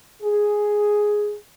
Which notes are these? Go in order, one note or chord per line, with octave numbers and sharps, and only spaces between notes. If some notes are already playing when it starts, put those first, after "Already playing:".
G#4